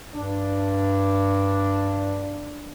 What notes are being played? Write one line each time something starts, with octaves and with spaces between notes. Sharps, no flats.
G2 D4